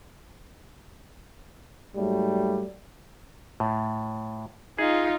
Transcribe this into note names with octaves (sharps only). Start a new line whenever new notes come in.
G#2 F#3 G3 A3
A2
D#4 F4 G#4